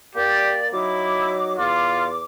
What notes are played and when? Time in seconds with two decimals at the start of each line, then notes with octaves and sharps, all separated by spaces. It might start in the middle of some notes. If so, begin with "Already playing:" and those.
0.15 A#3 G4 D5
0.72 F#3 D#4 E4 D6
1.58 E2 F4 D6